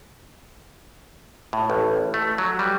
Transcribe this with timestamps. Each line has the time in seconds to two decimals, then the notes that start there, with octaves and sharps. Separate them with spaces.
1.53 A2
1.70 A1
2.14 A3
2.38 F#3
2.59 G3